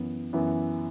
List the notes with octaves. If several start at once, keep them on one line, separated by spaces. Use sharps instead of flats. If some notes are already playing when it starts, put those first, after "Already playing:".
Already playing: F#2 E3 B3
F#2 E3 B3 E4